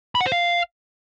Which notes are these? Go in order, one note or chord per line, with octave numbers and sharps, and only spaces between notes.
B5
F#5
C5
F5